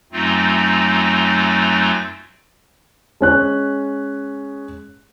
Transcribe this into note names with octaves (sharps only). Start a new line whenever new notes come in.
F#2 F#3 A3 C4 D#4 F4
G#3 C#4 F#6